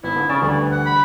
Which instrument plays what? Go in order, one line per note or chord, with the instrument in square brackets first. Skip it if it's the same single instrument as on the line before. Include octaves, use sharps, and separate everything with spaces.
[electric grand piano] G#1 [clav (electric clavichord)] B3 [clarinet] E4
[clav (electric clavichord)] D3
[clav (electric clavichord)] C#3 [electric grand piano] C#4 A6 E7 [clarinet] D5
[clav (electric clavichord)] D2 [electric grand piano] D3 G3 [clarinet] E3
[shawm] F#5
[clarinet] B5